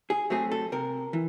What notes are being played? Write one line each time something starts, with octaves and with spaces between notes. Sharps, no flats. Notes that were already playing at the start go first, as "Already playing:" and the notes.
G#4
F#3 A3 C4 G#4
A4
C3 A#4
E3